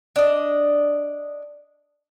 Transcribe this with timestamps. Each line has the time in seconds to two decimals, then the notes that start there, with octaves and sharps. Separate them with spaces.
0.16 D4 D#5